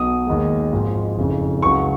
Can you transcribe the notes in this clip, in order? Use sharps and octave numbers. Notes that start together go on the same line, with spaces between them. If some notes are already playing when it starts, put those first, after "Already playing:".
Already playing: B1 B2 F#3 D#6
D#2 D#3 G#3
G#1 G#2 F3
F#1 F2 C#3
C#2 C#3 F#3 C#6